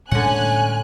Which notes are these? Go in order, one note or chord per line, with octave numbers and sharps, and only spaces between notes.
A2 D3 G3 G#3 C#4 F#5 G#5 F#6